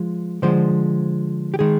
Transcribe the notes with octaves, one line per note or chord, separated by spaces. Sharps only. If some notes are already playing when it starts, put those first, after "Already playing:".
Already playing: F3 G#3
D3 F3 G#3 C5
G4
D#3 G#3 G#4